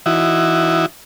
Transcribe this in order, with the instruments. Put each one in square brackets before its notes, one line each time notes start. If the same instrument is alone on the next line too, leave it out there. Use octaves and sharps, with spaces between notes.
[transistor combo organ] E3 D#4 E4 F#4